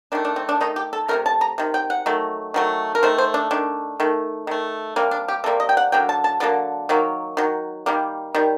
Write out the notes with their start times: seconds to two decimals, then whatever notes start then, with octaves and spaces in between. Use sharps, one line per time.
0.12 D#3 A3 D4
0.25 D4
0.36 C4
0.49 D4
0.61 D#3 A3 D#4
0.76 G4
0.93 A4
1.08 C3 D#3 A3 A#4
1.26 A5
1.41 A#5
1.58 C3 D#3
1.74 G5
1.90 F#5
2.06 D#3 F#3 A3
2.54 D#3 F#3 A3
2.95 A#4
3.03 D#3 A3 C5
3.18 C5
3.34 D4
3.51 D#3 A3 D4
4.00 D#3 A3
4.47 D#3 A3
4.96 C3 G3 A#3 D4
5.11 D4
5.28 G4
5.44 C3 G3 A#3 A4
5.60 D#5
5.69 G5
5.77 F#5
5.92 D3 F#3 A#3 G5
6.09 A5
6.24 A5
6.40 D3 F#3 A#3 A5
6.89 D#3 F#3 A#3
7.37 D#3 F#3
7.86 D#3 G3 A#3
8.35 D#3 G3